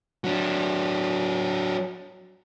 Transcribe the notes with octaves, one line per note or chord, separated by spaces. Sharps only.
F#3 D4